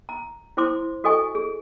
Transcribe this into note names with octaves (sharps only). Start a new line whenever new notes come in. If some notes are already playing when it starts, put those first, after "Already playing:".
A#5
E4 C5 C6 D6
F#4 A4 D#5 G#5 C#6
G#4